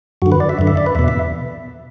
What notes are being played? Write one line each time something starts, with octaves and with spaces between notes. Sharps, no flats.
F#2 D3 F#4
B4
D5
E5
F#2 D3
E5
D5
B4
E2 B2 E5
E5